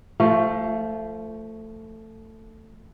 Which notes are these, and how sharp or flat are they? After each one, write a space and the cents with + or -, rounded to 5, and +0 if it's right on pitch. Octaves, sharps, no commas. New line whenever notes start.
F3 -10 A3 +15